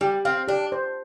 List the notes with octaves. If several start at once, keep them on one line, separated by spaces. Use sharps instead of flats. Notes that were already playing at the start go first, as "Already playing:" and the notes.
G3 G4
C4 F5
D4 G4
C5